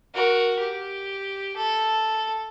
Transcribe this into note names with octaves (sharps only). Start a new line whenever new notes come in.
F#4 A#4
G4
A4